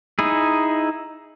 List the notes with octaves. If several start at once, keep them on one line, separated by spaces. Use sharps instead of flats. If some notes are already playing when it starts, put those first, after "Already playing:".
D#4 E4 G#4